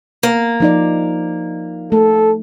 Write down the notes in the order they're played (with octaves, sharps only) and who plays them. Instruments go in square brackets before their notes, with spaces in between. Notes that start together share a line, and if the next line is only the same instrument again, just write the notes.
[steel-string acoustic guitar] A#3
[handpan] F3 D#4 D5
[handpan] A3 [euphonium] A4